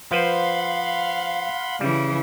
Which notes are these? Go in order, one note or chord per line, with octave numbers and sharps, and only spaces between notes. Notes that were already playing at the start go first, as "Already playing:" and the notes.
F3 B4 C5 F5 F#5 B5 C6
C#3 E3 G3